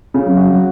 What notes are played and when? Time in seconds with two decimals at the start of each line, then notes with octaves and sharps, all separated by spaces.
0.14 C#3
0.25 F#3
0.37 F#4
0.53 F#3